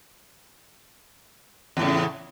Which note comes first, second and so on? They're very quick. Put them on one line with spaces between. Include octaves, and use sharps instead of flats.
E2 A2 C#3